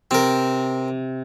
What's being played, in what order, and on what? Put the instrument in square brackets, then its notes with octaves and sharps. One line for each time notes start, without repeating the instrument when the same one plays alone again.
[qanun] C3 [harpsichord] C4 A#4